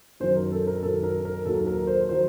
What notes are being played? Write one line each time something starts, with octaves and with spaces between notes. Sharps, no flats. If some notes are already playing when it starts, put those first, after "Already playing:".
F#2 D#3 F#3 C5
A#4
A4
A#4
F#2 D#3 F#3 A4
A#4
A#4
D#2 D#3 F#3 A4
A#4
C5
D#3 F#3 C5